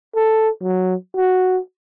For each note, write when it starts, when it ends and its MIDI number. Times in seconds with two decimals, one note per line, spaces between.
0.16 0.49 69
0.62 0.95 54
1.16 1.58 66